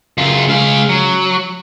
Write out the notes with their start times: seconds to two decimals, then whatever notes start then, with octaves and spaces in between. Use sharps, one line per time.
0.18 F#2 C#3 F4
0.49 G#3 F5
0.89 F#3